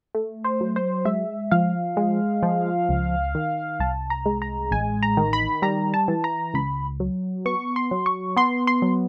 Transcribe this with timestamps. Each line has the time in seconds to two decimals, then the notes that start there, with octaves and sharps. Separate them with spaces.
0.15 A3
0.44 C5
0.61 F#3
0.76 C5
1.05 G#3 E5
1.51 F3 F5
1.97 G#3
2.43 F3
2.89 C#2
3.35 D#3
3.80 C2 A5
4.10 A#5
4.26 G#3
4.42 A#5
4.71 A1 G#5
5.03 A#5
5.17 D#3
5.33 B5
5.62 G3 A#5
5.94 A5
6.08 E3
6.24 A#5
6.54 C#2 B5
7.00 F#3
7.45 B3 C#6
7.76 C6
7.91 F#3
8.06 C#6
8.36 B3 C6
8.67 C6
8.82 F#3